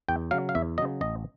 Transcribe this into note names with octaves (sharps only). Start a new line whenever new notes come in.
E2 G5
C#3 F#3 F5
F5
E2 E5
C#3 F#3 D#5
A1 D#5